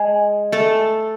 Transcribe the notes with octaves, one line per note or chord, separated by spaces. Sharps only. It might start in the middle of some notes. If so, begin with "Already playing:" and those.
Already playing: G#3 G#4
A3 A4